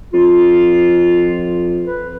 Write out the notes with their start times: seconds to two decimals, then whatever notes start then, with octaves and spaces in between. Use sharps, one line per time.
0.14 F2 F4
1.85 B4